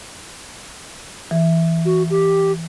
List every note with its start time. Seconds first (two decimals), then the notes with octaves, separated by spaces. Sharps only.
1.31 E3
1.85 F#4
2.10 G4